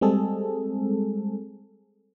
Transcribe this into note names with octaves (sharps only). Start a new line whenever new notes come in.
G3 G#3 C4 G#4 A4